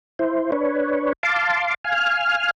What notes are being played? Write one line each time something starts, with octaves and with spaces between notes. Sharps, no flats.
E4 C5
D4 B4 C#5
F5 A5 C6 D6
F5 G#5 F6